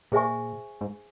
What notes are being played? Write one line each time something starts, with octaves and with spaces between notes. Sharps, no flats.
A#2 G#4 C5 E5 G#5 C#6
G#2